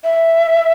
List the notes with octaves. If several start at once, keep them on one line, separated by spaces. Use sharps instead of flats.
E5